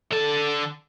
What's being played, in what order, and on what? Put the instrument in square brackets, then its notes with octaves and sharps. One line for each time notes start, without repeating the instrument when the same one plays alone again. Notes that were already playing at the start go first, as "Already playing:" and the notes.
[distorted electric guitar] D3 A5 [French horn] A4